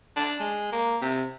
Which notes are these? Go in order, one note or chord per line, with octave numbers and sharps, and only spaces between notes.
D4
G#3
A#3
C3